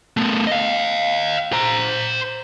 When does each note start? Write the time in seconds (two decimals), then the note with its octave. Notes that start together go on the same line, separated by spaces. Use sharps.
0.17 A3 B3
0.47 D#5 F5
1.53 C5 A#5